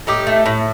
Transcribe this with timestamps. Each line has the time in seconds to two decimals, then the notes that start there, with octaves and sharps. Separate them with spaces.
0.07 A2 D#4 G4
0.27 A3
0.46 A2